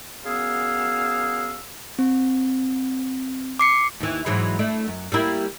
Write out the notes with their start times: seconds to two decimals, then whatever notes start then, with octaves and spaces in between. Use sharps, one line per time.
0.24 F#2 B3 G#4 F5 E6
1.99 C4
3.59 D6 C7 C#7
4.00 D#2 E3
4.26 G#2 E3 F#3
4.59 A3 D4 E4
4.88 F#2
5.12 G3 A#3 E4